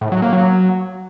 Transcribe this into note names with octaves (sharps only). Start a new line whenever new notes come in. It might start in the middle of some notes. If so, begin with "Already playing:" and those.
A2
F#3
A#3
F#3